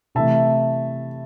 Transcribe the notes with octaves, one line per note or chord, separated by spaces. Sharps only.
C3 E3 A3 E5 A5